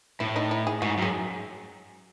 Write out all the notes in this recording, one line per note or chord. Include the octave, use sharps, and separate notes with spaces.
A2 E4
D#4
E4
G#4
G#2 F#4
F#2 G#4